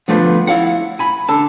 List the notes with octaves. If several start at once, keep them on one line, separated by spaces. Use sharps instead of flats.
D3 F3 A3 B3 C5
E4 F5 F#5
G#5 B5
D3 A4 A5